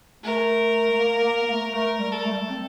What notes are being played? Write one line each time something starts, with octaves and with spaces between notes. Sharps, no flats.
A3 A#4
A3
A#3
A#3
A#3
A3
A3 A#4
G3
A4
A3
G3
A3
C4